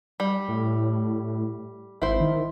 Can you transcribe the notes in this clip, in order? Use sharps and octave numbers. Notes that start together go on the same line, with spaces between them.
G3
A2
G#1 E4 C5
D#3